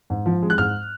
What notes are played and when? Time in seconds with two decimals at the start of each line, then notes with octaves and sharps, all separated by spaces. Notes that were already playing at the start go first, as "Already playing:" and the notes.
0.10 G#2
0.26 F3
0.42 G#3
0.50 F#6
0.58 G#2 F6